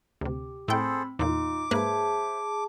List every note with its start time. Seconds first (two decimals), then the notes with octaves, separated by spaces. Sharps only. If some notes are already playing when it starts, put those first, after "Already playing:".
0.21 D2 C3 G4
0.68 A2 C4 G#4 A4 C5 G5 B5 E6
1.19 E2 A#2 D#4 F4 D6
1.71 G#2 A#3 G#4 B4 C5 E5 A5